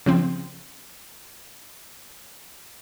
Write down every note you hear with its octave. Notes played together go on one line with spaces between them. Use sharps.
C#3 F3 C4